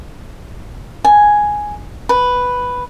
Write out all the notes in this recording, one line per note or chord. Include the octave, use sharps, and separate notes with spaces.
G#5
B4